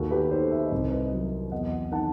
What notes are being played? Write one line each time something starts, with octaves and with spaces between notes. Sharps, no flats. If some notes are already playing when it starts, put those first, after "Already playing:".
Already playing: D#2 F#4 A4
G4 B4
D#3 A4 C5
E5
D#5
C2
C5
B4 D#5
F#3
E2 D#5 F#5
D#3 F#5 A5